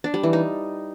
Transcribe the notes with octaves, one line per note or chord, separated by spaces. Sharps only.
D4
G3
E3
D#4